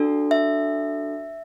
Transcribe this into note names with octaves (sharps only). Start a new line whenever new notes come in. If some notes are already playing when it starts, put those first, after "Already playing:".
Already playing: D4 F#4 A4
E5